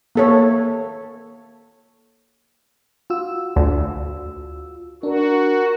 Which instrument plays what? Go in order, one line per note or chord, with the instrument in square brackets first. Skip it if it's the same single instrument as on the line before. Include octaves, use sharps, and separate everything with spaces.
[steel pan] A#3 A4 C#5
[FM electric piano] F4 F#4 E6
[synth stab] D2
[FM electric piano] D4 [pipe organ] F#4 [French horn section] A#4